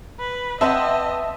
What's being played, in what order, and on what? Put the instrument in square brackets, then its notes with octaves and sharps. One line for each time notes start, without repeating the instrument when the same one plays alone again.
[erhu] B4
[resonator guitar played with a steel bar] C4 B4 F#5 [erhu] D#5 [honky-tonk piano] E5 A5 C6